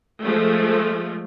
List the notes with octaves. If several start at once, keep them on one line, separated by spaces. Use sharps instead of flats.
F3 G#3 A3